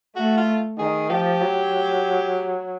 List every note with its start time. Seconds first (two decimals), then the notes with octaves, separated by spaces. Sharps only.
0.16 A3 F#4
0.37 F4
0.78 D#3 G#4
1.10 F3 G4
1.41 F#3